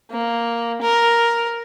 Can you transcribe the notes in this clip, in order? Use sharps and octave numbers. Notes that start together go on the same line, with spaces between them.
A#3
A#4